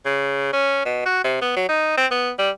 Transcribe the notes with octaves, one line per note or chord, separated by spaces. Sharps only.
C#3
C#4
B2
F#4
C3
B3
F#3
D#4
C4
B3
G3